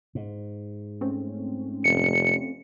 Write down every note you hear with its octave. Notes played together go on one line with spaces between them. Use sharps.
G#2
A3 C4 C#4
F1 C#7